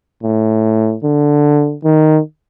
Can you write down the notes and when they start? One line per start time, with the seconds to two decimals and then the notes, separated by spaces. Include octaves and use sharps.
0.23 A2
1.03 D3
1.84 D#3